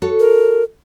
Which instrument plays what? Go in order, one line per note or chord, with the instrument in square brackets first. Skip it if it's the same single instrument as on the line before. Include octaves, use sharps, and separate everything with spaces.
[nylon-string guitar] F#4 A4 C#5
[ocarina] A#4